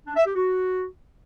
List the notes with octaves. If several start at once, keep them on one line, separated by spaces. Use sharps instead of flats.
D4
E5
G4
F#4